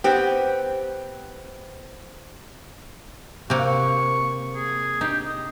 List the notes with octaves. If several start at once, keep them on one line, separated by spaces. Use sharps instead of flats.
B3 C4 G4
C3 A#3 F#4
C#6
G#4
D#4 G4
D#5